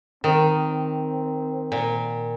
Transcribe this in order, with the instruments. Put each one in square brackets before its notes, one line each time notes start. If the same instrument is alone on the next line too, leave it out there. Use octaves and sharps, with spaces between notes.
[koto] D#3 [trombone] C4
[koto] A#2